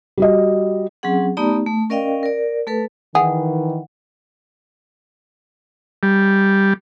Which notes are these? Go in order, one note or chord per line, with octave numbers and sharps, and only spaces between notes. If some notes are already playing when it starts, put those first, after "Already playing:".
G3 F#4 D#5
F#3 C4 C#4 G#4 F#5
A3 B3 D#4 G4 D5 A#5
A3
C#4 A#4 D5 D#5 F5 G5
A#4 D5
A3 A4 B4
D#3 E3 G#4 F#5
G3